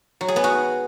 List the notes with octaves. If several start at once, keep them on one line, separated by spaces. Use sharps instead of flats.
F#3
G#4
B3
F#4